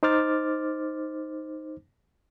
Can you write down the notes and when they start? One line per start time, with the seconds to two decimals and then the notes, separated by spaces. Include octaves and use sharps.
0.03 D#4 C5 D6 F6 A6